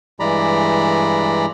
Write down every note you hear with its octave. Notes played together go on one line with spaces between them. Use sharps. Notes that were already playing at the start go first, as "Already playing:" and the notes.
G2 E3 G#3 D5 A#5 B5